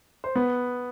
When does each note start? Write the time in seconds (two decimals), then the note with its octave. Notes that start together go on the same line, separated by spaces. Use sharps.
0.24 C5
0.35 B3 B4